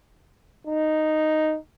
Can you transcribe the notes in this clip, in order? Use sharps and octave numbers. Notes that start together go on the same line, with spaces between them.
D#4